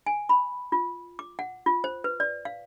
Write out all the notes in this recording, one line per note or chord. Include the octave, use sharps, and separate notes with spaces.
G#5
B5
F4
D6
F#5
F4
C5
B4
D5
F5